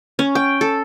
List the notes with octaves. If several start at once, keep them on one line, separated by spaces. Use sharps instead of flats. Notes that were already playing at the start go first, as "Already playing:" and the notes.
C#4
G5
A4